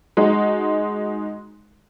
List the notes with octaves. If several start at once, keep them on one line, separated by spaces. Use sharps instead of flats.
G#3 D#4 F#4